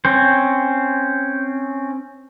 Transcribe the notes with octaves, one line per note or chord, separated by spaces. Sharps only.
C4 C#4 C5